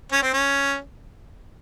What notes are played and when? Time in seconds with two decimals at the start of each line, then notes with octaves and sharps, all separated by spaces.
0.12 C#4
0.23 C4
0.33 C#4